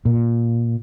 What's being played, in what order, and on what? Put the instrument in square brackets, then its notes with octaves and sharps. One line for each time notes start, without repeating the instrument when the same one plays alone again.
[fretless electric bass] A#2